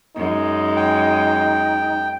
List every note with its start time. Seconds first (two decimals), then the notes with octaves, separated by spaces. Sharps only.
0.16 F#2 G#3 D#4
0.77 G5